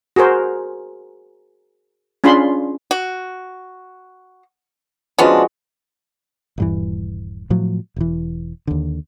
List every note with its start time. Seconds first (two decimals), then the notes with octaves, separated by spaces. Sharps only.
0.16 F#4 G#4 A#4 C5
2.24 C#4 D4 F4 G#4 B5 C6
2.91 F#4
5.18 F3 G#3 B3 C#4 D4 F#4
6.58 D#1 G2 E3
7.50 A2 F3 F#3
7.96 E1 E3
8.67 D#2 D3